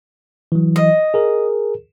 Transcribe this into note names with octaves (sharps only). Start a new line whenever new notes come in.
E3 F#3
D#5
G#4 A#4